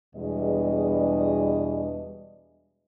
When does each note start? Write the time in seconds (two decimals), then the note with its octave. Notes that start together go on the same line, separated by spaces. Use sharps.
0.16 E2 B2 G3 G#3 D4 D#5